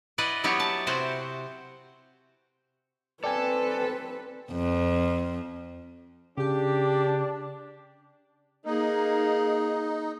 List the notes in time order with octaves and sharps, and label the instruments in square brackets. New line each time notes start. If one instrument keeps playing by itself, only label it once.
[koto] E4 B4 D5 D#5 F#5
F#3 B3 E4 F#4 G4 C#5
A5
C3 C4 E4 F#4 C5 G5
[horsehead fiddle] C4 B4 [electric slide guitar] A4 [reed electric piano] D5 G5 G#5
[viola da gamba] F2
[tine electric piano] C#3 [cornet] D4 [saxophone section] G4
[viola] A#3 G#4 [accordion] D#4